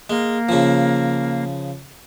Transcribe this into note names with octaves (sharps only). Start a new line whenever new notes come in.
G#3 A#3
C#3 F3